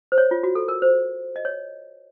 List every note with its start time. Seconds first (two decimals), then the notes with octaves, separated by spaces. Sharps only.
0.12 C5
0.18 C#5
0.31 F4
0.43 F#4
0.55 A4
0.68 A#4
0.82 C5
1.36 D#5
1.45 C#5